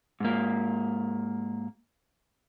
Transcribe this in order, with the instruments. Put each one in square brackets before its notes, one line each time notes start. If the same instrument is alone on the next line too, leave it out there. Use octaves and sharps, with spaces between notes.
[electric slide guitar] G#2 A#3